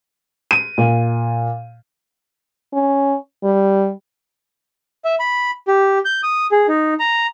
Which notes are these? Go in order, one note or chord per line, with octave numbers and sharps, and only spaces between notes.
D#7
A#2
C#4
G3
E5
B5
G4
G6
D#6
G#4
D#4
A#5